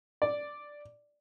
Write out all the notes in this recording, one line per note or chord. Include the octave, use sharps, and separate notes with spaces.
D5